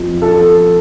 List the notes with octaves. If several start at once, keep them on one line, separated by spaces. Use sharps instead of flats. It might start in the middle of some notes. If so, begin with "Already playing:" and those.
Already playing: F2 F3 C4
A4